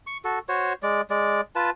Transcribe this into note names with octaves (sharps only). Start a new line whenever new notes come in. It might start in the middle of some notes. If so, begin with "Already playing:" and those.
C#6
F#4 A4
F#4 C5 C#5
G#3 D5
G#3 D5
F4 B4 A5